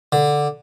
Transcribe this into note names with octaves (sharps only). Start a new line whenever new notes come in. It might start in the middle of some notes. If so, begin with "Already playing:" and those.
D3